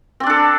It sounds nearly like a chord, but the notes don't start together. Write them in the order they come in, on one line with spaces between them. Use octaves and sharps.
C4 D5 D4 A4